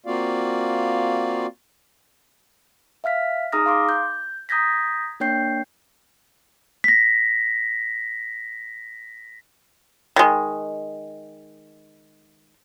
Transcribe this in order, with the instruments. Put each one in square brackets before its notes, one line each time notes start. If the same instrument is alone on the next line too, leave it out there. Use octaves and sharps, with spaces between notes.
[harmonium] A#3 C4 F4 F#4 D5 F5
[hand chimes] E5 F5 F6 B6
D#4 G#4 A#5 D#6 F6 A#6
F5 C6 D6
G6
A#5 D#6 G6 G#6 A#6 B6
A#3 D4 C#5 G5 G6 C7
[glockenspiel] A#6 B6
[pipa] D#3 G#3